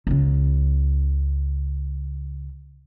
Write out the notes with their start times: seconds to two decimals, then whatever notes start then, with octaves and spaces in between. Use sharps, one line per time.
0.07 C#2 C#3